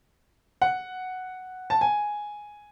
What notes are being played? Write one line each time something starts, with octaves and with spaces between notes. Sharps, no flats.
F#5
A5
G#5